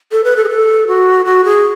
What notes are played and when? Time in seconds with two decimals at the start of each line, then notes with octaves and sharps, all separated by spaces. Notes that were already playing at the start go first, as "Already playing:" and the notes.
0.12 A4
0.24 B4
0.37 A4
0.44 G#4
0.49 A4
0.87 F#4
1.25 F#4
1.45 G#4